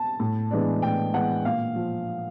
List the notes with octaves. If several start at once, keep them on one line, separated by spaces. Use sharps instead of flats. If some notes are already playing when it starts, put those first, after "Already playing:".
Already playing: A5
A2
E3 G#3 B3 D4
A2 G5
E3 G#3 B3 D4 F#5
A#2 F5
F3